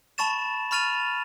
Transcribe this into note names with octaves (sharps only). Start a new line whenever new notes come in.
A5 B5 C#6 A6 E7
B5 C#6 F6 A6 D#7 F7